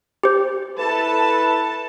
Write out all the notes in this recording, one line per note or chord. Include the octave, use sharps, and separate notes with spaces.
G4 C5
E4 A4 B4 A5